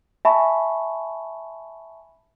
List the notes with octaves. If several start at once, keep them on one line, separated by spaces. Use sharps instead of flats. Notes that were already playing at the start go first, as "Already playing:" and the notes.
E5 G#5 A5 B5 C#6